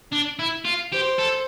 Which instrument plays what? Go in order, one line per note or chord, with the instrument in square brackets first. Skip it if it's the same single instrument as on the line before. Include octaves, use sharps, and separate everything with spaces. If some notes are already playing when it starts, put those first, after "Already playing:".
[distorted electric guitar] D4
E4
F4
[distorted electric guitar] G4 [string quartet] C5
[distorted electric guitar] A4